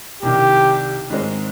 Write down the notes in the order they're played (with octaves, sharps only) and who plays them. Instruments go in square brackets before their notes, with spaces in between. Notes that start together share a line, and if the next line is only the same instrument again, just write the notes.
[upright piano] C2 C3 D#3 [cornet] G4
[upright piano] G#2 D#3 G#3 C4